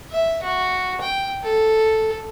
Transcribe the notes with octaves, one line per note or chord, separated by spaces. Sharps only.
E5
F#4
G5
A4